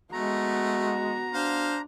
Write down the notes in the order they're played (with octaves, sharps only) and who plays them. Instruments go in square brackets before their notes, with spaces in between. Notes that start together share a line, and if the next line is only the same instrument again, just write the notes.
[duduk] G#3 [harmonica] A3 [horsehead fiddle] B3 F#4 [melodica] A#5
[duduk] D4 [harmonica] C5 F5